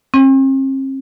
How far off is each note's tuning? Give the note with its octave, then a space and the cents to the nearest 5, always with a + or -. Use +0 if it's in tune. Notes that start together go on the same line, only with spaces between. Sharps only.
C4 +45